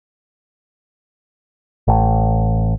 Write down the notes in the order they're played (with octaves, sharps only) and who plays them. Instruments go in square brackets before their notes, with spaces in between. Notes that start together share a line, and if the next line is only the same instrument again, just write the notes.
[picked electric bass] A1